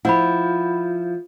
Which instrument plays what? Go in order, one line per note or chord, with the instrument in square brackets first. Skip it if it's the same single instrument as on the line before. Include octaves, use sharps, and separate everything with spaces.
[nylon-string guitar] F3 E4 [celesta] F#5 B5